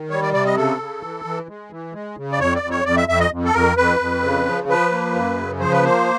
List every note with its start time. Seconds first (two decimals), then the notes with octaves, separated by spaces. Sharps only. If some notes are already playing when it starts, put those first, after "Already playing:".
Already playing: D#3
0.10 G3 C#5
0.22 D5
0.34 C3 D5
0.45 D#5
0.56 C#3 A4
0.79 C#3
1.02 E3
1.25 E3
1.48 G#3
1.71 E3
1.93 G#3
2.17 C#3
2.32 D5
2.40 F2 C#5
2.55 D5
2.62 F2
2.70 C#5
2.85 F2 D5
2.97 E5
3.08 F2 E5
3.20 D#5
3.31 F2
3.45 A4
3.54 F2 A#4
3.77 F2 B4
4.00 F2
4.23 C#3
4.46 F3
4.68 F3 B4
4.91 A#3
5.14 F#2
5.37 C#3
5.60 F3 C5
5.72 B4
5.82 A#3 C5